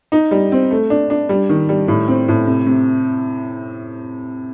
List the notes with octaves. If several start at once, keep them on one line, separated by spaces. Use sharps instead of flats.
D#4
G3
C4
A3
D4
D4
G3
D#3
G3
A2
C4
A2
C3
C3